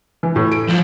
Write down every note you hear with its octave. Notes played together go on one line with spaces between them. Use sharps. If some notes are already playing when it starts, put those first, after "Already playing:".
E3
A2
D7
F3 F#3